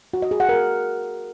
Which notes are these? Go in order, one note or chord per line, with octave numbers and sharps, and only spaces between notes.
F#4
D#5
G#4
F#5
A#4